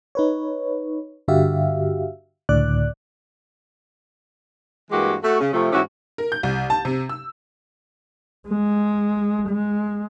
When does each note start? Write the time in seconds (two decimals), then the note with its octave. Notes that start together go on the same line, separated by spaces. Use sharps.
0.15 D#4 B4 C#5
1.28 G2 D3 F#4 G4 E5 F5
2.49 C#2 A2 D3 D5 D6 F#6
4.91 G2 E3 G#3 A#3 F#4 G4
5.23 A3 F#4
5.41 C#3
5.53 C3 F3 A3
5.73 G#2 E3 C#4 E4 F#4 G4
6.18 A#4
6.32 G6
6.43 C2
6.70 A5
6.85 C3
7.09 E6
8.49 G#3
9.49 G#3